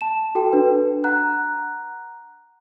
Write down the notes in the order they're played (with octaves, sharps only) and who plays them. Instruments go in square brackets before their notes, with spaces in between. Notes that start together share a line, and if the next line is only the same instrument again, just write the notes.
[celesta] A5 E7
F#4 A4 G5
D4 B4
F#5 A#5 F#6